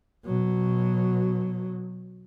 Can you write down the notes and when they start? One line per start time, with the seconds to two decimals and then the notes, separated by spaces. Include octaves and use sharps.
0.24 B2 F#3